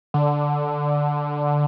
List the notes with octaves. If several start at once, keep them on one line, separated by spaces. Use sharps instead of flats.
D3